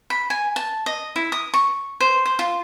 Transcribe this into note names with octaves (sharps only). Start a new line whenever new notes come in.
B5
G#5
A5
D#5
E4
D#6
C#6
C5
C5
F4